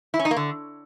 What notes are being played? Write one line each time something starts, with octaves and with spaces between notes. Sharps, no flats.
E4
C#4
D#4
A#3
D3